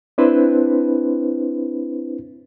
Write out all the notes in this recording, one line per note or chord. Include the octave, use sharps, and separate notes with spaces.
C4 D4 E4 B4 C5